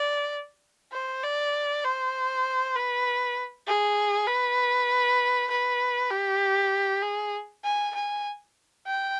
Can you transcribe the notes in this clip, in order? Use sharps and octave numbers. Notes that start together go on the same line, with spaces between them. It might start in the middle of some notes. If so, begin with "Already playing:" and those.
Already playing: D5
C5
D5
C5
B4
G#4
B4
B4
G4
G#4
G#5
G#5
G5